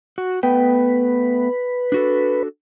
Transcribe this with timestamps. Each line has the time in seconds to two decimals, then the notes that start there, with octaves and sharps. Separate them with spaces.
0.18 F#4
0.43 A3 B3 B4 G5
1.92 D4 F#4 A4